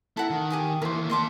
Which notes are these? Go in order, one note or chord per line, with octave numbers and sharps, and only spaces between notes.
E4 A4 F#5 A#5
D#3
G4 G#5 D#6
D#2 E3 A#4 C5
A#3 D#5 A5 C6 D6